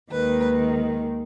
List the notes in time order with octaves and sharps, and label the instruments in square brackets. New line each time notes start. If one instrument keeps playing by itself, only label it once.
[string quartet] D#2 D#3 G#3 B4